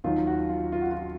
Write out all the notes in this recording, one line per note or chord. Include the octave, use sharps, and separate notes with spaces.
D#2 D#3 F#3 F4
F#4
F4
F4
F#4
F4